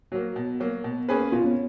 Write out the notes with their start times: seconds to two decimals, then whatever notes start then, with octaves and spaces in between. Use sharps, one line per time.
0.12 F#3 A#3 F#4
0.36 B2
0.60 F#3 A#3
0.84 B2
1.09 A#3 C#4 G#4 B4
1.32 B2 F4
1.44 C#4